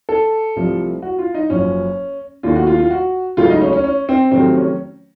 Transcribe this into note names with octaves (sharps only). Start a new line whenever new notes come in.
A4
C2 C3 F3 A3
F#4
F4
D#4
F#1 F#2 F3 C#4
D#2 D#3 A3 F4
F#4
F4
F4
F#4
C#2 C#3 F#3 A3 F4
D#4
C#4
C#4
C#4
C4
F2 C3 D#3 F#3 A3 C4
C#4